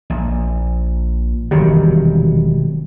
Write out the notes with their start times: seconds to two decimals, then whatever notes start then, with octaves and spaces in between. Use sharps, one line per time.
0.10 A#1
1.51 E1 C3 D#3 F#3 G3